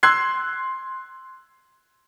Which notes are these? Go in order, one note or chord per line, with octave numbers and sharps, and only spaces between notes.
C6 E6 F#6 G#6 C7